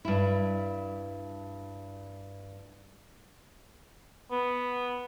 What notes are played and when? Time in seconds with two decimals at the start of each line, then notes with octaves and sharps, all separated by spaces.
0.05 G2 E4
4.31 B3